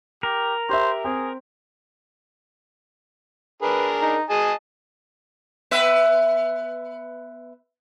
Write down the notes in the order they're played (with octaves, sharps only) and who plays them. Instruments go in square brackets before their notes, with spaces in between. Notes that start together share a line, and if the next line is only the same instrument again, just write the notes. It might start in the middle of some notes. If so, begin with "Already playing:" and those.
[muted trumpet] G4 [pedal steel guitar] A#4
[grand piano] G4 E5 [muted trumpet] C5
[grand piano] C4 [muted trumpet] G#4
[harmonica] D4 G#4 A#4 [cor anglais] B4
[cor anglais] D#4
[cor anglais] G#4 [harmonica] D#5 G#5 A5
[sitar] B3 B4 E5